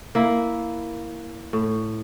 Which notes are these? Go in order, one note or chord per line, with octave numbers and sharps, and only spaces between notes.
A#3 E4
A2